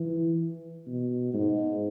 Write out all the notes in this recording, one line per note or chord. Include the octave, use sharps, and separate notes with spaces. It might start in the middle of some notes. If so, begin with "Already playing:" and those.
Already playing: E3
B2
G#2